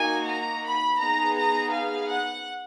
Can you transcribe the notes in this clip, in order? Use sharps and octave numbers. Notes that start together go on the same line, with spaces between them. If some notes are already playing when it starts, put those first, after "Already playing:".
Already playing: A#3 D#4 F#4 G#5
A#5
B5
B3 D#4 G#4 A#5
A#5
F5
F#5